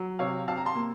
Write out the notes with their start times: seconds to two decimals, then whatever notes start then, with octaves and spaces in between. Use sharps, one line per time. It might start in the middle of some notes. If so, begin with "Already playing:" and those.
Already playing: F#3
0.19 C3 C#5 F5
0.48 C3 F5 A5
0.57 A#5
0.65 A5 C6
0.75 A#3